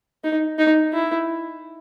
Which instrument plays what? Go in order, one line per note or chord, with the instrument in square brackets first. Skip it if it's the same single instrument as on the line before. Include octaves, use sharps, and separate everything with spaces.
[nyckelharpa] D#4
D#4
E4